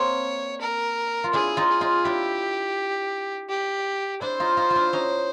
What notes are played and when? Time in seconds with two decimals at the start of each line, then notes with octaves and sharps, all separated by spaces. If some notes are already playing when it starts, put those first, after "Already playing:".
Already playing: A#3 C4 C#5
0.61 A#4
1.24 F4
1.33 D4 E4 G#4
1.57 D#4 F4
1.70 G#4
1.81 D#4 F4
2.05 D4 E4 G4
3.49 G4
4.21 D4 E4 C5
4.40 D#4 F4
4.57 D#4 F4
4.70 F4
4.75 D4 E4
4.93 C#4 D#4